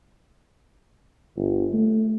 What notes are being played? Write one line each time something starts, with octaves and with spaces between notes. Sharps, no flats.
G1
A3